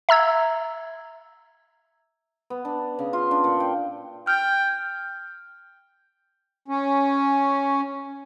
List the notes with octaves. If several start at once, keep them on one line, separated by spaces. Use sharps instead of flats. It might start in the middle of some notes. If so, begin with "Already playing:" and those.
E5 A#5 E6 G#6
B3
D4
C#3
F4
D4
A#2
G5
G5 F6
C#4